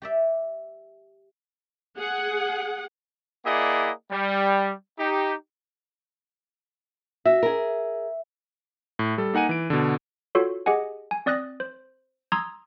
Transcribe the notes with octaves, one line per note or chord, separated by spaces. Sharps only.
G4 D5 E5
G#4 F#5
A#3 E4 G#4 D5 D#5 F#5
G3
D#4 G4
F#4 E5
G#4 A#4
A2
G3 A4
A#3 D#4 F#5 G#5 D#7
E3 D7
B2 D3
F4 F#4 A4 C#5
G4 G#4 D#5 F#5 G#5
G#5
C4 D5 D#6 F#6 A#6
C5
A#5 C6 D#6 E6 G#6